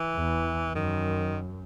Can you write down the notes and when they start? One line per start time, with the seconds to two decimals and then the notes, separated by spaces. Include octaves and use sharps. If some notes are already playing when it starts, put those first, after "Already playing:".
Already playing: E3
0.15 E2
0.75 F#2 D#3